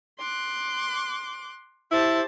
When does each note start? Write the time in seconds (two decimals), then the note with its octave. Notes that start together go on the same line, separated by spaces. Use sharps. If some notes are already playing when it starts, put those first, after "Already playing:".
0.19 C6 D6 F#6
1.91 E4 G4 C5 A5